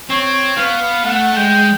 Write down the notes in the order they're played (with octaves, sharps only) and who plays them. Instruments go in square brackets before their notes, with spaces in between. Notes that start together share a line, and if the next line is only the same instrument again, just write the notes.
[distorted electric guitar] C4 [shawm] C#5
[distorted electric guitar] B3 [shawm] F5
[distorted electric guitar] A3 [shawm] F#5
[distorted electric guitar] G#3 [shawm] G5